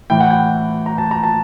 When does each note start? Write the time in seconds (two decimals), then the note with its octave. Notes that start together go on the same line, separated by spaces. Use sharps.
0.10 A2 E3 G5
0.20 F#5
0.31 G5
0.86 A#5
0.98 A5
1.11 A#5
1.24 A5